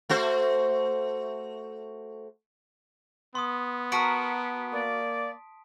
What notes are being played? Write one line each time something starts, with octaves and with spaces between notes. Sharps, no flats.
A3 F#4 C5
B3 C6 D#6
F#4 A#4 A5 B6 D7
A#3 D5